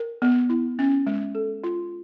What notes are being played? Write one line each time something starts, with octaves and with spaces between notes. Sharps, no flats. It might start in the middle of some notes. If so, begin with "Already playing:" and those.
Already playing: A#4
B3
E4
C#4
G#3
A4
F4